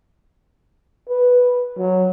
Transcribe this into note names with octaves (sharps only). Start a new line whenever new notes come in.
B4
F#3